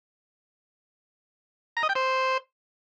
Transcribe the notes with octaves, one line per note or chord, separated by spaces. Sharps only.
A#5
D#5
G5
C5